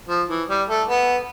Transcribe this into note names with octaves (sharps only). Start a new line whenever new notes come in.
F3
E3
G3
A3
B3